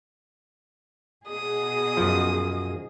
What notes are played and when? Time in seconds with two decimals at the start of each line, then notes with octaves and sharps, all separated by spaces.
1.28 B2 G#4 D#5 D#6
1.97 F#2 F3